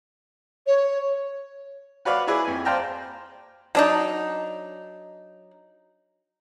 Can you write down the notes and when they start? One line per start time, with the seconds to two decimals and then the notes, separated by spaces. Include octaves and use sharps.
0.66 C#5
2.05 F#4 B4 C#5 D5 F5
2.27 E4 G#4 B4 D5
2.45 F2 G#5
2.65 C5 D5 F5 G5 A5 A#5
3.75 F#3 D4 D#4